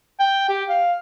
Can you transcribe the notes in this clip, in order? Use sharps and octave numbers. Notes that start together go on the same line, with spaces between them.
G5
G4
F5